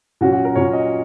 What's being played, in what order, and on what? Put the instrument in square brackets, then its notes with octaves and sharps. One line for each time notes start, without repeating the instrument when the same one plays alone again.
[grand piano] A#2 F#3 C#4 F#4
F#4
A#4
A#2 F#3 C#4 C#5
D#5